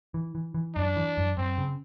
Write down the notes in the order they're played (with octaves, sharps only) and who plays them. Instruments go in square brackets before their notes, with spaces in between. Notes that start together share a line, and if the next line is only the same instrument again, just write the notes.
[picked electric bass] E3
E3
E3
[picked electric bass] F#2 [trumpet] D4
[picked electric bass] E3
F#2
[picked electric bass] F#2 [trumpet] C4
[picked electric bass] C#3